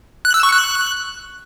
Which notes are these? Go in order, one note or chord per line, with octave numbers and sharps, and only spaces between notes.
F#6
E6
C#6
F#6